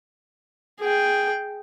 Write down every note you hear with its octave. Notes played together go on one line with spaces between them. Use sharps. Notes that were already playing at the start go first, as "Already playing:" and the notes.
G#4 G5